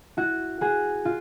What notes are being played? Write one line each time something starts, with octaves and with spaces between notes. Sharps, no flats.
E4 F#4
F#4 G#4
F4